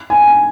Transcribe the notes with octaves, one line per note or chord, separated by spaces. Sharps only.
G#5